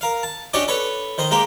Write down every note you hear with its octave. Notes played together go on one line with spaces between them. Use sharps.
A#4 F5
A5
C#4 D4 F#4 G4 D5 D#5
A4 B4 C#5
D#3 C5 D#5
G#3 A#3 G4 A#4